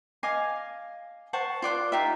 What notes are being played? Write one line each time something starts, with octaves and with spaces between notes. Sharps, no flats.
D#5 F5 G#5 D6
C5 F#5 A5 C#6
F4 D5 F#5 C6
D#4 F4 G4 E5